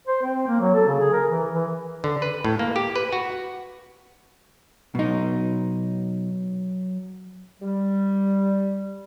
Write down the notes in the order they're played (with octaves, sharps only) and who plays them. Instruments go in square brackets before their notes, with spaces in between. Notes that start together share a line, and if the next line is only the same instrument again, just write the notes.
[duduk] C5
C4
A#3
F#3
A4
C#3
G#4
A#4
E3
E3
[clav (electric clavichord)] D3
B4
A2
A#3
G4
B4
F#4
[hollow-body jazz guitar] B2 D#4 [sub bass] F#3
[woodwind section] G3